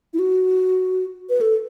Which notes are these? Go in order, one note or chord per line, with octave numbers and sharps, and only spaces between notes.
E4
F#4
B4
A4